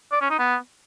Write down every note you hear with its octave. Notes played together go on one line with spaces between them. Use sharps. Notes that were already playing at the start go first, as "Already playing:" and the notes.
D5
C#4
D#4
B3